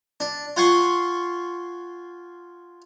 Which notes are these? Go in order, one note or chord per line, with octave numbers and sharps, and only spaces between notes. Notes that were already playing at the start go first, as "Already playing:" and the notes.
D4
F4 F#5 G#5 C6 C#6